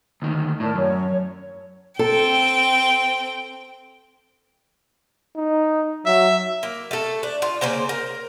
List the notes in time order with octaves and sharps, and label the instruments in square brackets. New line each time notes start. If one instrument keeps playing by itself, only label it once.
[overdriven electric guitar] D2 D#3
[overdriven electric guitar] A2 [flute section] A#4 D5 A5
[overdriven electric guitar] F#2 [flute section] C#5
[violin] C4 G5 [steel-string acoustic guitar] A4
[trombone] D#4
[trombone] F#3 [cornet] E5
[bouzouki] A#3
A3 A4
D4
F4
C#3 A#3 C5 A#5
A#4